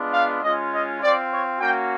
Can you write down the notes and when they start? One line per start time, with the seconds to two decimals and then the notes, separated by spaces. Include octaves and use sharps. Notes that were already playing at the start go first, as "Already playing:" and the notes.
Already playing: G#3 B3 D4 F4
0.13 F5
0.43 G#3 C#4 F4 D#5
0.72 D#5
1.02 C4 F4 D5
1.31 C#5
1.61 A#3 C#4 F#4 G5